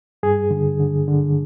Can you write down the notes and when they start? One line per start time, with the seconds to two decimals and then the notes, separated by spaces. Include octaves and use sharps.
0.23 G2 G#4
0.51 D3
0.80 D3
1.07 D3